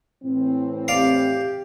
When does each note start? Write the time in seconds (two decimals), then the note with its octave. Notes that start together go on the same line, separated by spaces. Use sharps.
0.24 A2 E3 C4
0.88 G4 D5 F5